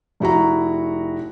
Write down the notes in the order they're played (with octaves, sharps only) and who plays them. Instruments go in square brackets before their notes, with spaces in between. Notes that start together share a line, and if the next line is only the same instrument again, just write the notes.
[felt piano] F1 E4 F#4 A#5